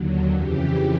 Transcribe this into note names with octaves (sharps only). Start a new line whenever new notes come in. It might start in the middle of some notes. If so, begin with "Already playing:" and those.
Already playing: D#2 D3 F#3
F2 C#3 E3 G4